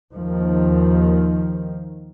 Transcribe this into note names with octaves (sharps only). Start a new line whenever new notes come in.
D#2 D#3 F3